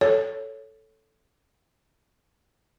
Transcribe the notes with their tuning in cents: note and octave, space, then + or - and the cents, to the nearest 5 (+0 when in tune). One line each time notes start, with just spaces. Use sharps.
A4 +0 C#5 +0